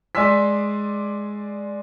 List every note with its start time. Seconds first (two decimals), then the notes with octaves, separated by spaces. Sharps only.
0.15 G#3 D5 G#5 C6 E6 B6